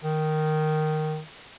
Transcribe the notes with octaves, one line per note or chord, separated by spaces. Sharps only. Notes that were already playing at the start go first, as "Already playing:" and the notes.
D#3